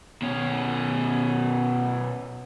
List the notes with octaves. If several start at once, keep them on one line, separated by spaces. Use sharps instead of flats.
B2 C#4